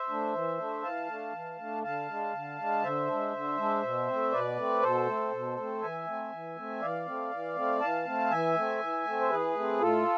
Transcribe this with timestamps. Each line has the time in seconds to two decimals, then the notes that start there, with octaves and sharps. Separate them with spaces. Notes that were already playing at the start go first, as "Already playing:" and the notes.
Already playing: C5 E5
0.09 A3 D4
0.33 E3
0.58 A3 D4
0.83 E3 F5 A5
1.08 A3 D4
1.33 E3
1.58 A3 D4
1.83 D3 F5 A5
2.08 G#3 D4
2.33 D3
2.58 G#3 D4
2.83 D3 C5 E5
3.07 G#3 D4
3.32 D3
3.57 G#3 D4
3.83 B2
4.07 A3 C4
4.32 B2 B4 D5
4.56 A3 C4
4.81 B2 A4 C5
5.06 A3 C4
5.32 B2
5.57 A3 C4
5.81 E3 E5 G#5
6.07 A3 C4
6.32 E3
6.56 A3 C4
6.81 E3 D5 F5
7.06 A3 C4
7.31 E3
7.55 A3 C4
7.81 E3 F5 A5
8.05 A3 C4
8.30 E3 E5 G#5
8.56 A3 C4
8.80 E3
9.05 A3 C4
9.20 C5
9.30 E3 G#4 B4
9.54 A3 C4
9.79 A2 F4 A4